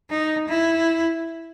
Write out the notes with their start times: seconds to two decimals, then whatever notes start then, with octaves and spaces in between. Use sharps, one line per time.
0.10 D#4
0.48 E4